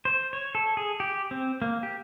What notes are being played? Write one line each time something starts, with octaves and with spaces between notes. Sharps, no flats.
C5
C#5
A4
G#4
G4
C4
A#3
G4